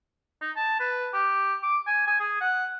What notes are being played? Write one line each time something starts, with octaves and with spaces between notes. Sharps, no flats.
D#4
A5
B4
G4
D6
G#5
G#5
G#4
F#5